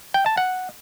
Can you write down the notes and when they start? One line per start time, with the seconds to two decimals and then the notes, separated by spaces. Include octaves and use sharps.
0.14 G5
0.26 A5
0.37 F#5